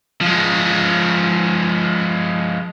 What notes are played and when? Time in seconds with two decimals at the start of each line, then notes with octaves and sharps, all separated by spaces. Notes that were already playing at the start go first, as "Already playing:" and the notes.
0.21 F3 G#3